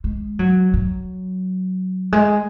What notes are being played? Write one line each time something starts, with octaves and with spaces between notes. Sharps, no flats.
G#3
F#3
F#3
G#3